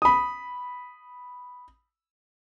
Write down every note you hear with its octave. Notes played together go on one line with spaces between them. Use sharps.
B5 D#6